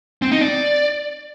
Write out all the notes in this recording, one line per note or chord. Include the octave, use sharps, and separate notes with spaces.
C4
D#4
D5